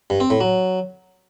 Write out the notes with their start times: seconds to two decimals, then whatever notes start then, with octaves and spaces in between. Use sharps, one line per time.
0.10 G2
0.20 C4
0.30 A2
0.40 F#3